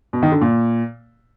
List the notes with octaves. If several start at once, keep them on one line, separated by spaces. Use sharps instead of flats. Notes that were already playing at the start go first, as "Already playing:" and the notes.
B2
D#3
D3
A#2